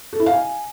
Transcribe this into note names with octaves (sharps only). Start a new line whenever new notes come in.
A4
E4
F5
G#5